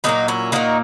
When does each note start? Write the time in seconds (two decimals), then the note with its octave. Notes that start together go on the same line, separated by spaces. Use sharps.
0.04 A#2 F#3 A#3 B3 D#4
0.28 C#4 E4
0.52 A#2 A#3 D#4 F#4